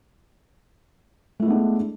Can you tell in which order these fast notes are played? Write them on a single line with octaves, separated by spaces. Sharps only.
A3 E4 G#3 B3 D4